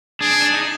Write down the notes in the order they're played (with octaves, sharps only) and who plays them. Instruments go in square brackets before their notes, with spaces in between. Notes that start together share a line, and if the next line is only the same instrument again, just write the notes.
[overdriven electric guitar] D4 [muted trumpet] G#4
[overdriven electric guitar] D4
D#4